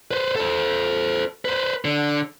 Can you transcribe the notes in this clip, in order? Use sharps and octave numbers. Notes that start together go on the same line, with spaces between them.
B4 C5
A4 C5
B4 C5
D3